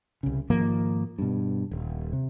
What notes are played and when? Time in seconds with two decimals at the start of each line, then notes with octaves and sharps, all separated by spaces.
0.23 C2 C#3
0.50 G#2 D#3 F3 A#3
1.18 G2 B2
1.71 D#1
2.13 C3